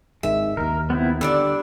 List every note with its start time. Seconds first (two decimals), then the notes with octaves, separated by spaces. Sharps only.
0.23 G#1 D#3 G#3 E5
0.57 D#2 D#3 A#4
0.90 B3 C4 E4
1.21 D3 G3 D4 D5 E6